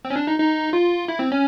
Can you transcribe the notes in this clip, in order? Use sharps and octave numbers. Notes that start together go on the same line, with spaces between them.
C4
C#4
D4
D#4
D#4
F4
E4
C4
C#4